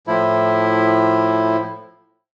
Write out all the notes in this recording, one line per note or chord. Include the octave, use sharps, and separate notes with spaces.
A2 F3 E4